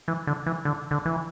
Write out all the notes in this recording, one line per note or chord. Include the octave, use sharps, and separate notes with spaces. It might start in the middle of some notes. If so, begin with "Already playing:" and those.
E3
D3
E3
D3
D3
E3